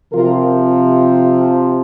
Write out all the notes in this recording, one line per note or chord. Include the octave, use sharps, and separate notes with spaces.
C3 F3 C4 F4 A#4